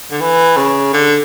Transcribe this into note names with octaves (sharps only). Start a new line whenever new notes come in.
D3
E3
C#3
D3